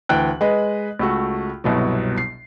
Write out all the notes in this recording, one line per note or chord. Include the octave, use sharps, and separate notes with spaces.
D2 E3 G5 F#6
G#3 B4 D#5
C#2 A3 F#4
G1 C2 B2 F#3
C7